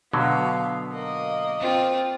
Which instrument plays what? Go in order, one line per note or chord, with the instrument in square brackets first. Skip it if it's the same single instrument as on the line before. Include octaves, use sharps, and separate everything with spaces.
[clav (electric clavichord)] B2 D3 F#3 [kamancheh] B3 F5
[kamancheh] A#3 D#5
[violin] C4 F4